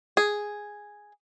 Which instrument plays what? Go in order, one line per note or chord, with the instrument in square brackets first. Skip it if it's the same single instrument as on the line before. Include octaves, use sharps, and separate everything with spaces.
[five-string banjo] G#4